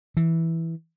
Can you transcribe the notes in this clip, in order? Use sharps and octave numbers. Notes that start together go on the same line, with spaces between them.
E3